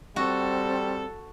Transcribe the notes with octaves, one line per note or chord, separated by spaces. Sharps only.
G3 C4 F#4 A4